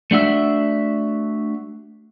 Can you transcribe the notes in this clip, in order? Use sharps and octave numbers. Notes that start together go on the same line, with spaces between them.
A3 D4 F#4 E5